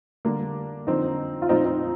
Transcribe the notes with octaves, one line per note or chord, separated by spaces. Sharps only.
D3 G3 A#3 D4
D3 F3 C4 D#4
F4
A#2 F3 C4 D#4
C4 D#4